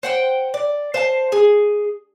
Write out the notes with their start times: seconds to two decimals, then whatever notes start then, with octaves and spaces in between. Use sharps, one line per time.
0.03 C5 F#5 G5
0.54 D5
0.94 C5 F5 A5
1.32 G#4